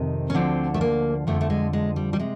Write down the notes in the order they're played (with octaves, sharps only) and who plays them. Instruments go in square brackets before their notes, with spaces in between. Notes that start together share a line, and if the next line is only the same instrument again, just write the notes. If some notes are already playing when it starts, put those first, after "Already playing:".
Already playing: [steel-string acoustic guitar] F2 C3 D#3
C#4
D2 D3 F3 C4
A3
A#3
F2 D3 F3 A3
A3
G#3
G#3
G3
G3
C3 G#3